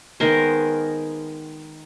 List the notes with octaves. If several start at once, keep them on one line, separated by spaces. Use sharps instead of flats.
D#3 G#3 B3 A#4 C5